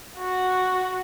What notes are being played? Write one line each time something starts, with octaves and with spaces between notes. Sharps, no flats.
F#4